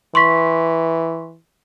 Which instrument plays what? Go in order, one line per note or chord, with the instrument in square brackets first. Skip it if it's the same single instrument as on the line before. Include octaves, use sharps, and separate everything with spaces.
[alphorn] E3 [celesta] C6 C#6 B6